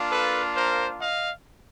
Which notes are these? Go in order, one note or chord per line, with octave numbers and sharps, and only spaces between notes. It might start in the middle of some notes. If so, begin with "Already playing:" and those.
Already playing: A#3 D4 F4
A4 B4
A#4 C5
D#5 F5